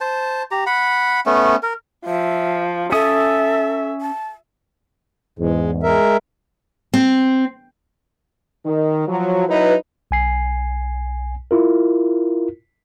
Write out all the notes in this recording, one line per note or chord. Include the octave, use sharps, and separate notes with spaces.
C5 A5
G4 A#5
F#5 B5
A3 B3 C#4
A#4
F3 E5
C#4 A4 E5 G#5 D#6
A5
E2 G#2 G#3
G#3 A#4 E5
C4
D#3
F3 F#3
F#3 D#4 E4 B4
B1 G#5 C7
E4 F4 A#4